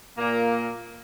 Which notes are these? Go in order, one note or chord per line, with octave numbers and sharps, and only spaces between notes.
A#2 A#3